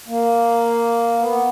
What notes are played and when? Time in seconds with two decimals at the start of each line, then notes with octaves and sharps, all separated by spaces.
0.08 A#3
1.18 B3